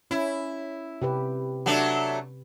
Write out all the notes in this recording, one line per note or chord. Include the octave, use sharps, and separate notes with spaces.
C#4 E4
C3 G4 B4
F#3 A3 D4